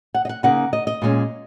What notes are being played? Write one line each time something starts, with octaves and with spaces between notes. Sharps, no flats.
F#5
D#5
F#5
C#3 A#3 D#4 F#5
D#5
D#5
A#2 G#3 C#4